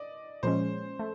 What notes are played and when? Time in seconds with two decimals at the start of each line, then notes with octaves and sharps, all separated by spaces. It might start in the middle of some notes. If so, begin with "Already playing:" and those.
Already playing: D5 D#5
0.43 A#2 F3 G#3 C#4 C5
0.99 A3